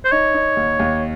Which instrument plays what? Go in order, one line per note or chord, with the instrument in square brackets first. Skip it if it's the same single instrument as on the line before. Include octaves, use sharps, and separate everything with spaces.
[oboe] C5
[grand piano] D#4 [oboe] C#5
[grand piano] D#4
D#2
D#2